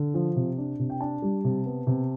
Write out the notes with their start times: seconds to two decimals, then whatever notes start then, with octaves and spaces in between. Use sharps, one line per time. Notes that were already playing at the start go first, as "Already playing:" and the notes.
Already playing: D3
0.14 F3
0.36 C3
0.57 D4
0.79 C3
0.90 G5
1.01 D4 A5
1.22 G3
1.44 C3
1.65 B3
1.87 C3